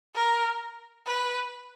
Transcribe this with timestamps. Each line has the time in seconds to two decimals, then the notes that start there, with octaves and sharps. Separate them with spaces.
0.15 A#4
1.06 B4